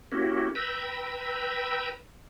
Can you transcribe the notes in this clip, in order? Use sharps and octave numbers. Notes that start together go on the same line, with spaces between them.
A#3 C#4 E4 F#4 G4
B4 G5 A#5 B5 E6